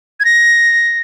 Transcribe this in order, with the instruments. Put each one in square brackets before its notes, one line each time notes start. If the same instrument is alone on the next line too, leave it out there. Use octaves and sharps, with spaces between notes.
[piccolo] G#6
A#6